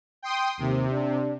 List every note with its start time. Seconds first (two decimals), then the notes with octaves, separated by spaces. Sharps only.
0.22 G5 C6 D#6
0.59 D#2 C3
0.92 D4